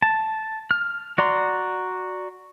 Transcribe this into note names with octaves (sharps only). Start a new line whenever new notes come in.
A5
F6
F#4 D5 A#5 C6